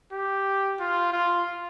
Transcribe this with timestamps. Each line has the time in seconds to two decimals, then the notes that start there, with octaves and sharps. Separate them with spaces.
0.13 G4
0.80 F4
1.13 F4